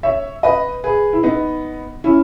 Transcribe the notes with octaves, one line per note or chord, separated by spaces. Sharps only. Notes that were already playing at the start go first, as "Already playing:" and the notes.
C#5 E5
B4 D#5
G#4 B4
E4
B3 D#4
C#4 E4